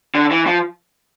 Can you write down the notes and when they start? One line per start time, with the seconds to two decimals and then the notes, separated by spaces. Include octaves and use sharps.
0.15 D3
0.31 E3
0.46 F3